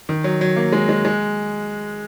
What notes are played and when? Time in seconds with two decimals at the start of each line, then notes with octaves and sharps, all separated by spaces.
0.09 D#3
0.24 F#3
0.41 F#3
0.56 A#3
0.73 G#3
0.89 G#3
1.05 G#3